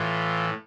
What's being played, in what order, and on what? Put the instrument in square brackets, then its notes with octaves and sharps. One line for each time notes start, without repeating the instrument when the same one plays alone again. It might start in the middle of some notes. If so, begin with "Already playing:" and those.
Already playing: [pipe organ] A2 E3 F4